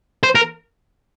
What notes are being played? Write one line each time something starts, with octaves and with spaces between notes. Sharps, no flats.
C5
A#4